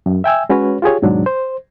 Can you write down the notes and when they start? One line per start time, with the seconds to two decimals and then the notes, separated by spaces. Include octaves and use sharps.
0.06 F#2
0.24 E5 G5 G#5 E6
0.49 G#3 C#4 F#4 B4 C#5
0.82 F4 G4 G#4 C#5
1.02 D#2 G#2 B2 F#3 G#3 D4
1.26 C5